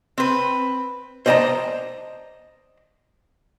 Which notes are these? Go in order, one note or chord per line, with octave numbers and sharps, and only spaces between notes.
C4 B4
C5 D5 D#5 F#5 A5 A#5